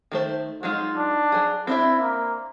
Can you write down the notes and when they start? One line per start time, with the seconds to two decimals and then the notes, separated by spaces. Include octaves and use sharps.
0.12 D#3 A3 C5
0.63 F#3 G#3 D#4 F4
0.97 D4
1.32 F#3 G#4
1.67 C4 D4 E4 E5
2.00 A#3